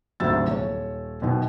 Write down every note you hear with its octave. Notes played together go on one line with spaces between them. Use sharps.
G#1 D2 C3 F#3 E6 A6
D#1 C#5
F#2 B2 D#3